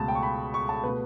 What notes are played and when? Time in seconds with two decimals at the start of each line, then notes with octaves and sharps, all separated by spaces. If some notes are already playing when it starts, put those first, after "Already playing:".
Already playing: C#2 B2 A3 A5
0.08 G5
0.15 C#6
0.23 B5
0.54 C#6
0.69 A5
0.84 B2 A3 B4